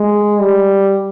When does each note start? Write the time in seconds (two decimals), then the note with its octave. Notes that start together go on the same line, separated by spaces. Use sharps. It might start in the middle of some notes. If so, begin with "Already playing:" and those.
Already playing: G#3
0.40 G3